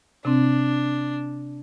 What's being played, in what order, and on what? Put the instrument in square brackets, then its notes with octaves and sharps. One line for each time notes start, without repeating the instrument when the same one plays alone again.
[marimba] C3 C4 [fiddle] D4